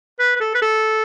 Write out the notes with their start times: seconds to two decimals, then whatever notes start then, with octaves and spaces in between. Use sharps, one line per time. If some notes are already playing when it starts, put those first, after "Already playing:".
0.19 B4
0.36 B4
0.40 A4
0.55 B4
0.62 A4